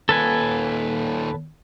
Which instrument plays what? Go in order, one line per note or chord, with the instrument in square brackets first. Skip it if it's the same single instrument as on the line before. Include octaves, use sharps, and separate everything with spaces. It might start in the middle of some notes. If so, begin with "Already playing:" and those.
[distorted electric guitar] D#2 A#2 [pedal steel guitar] A4 B4 G#5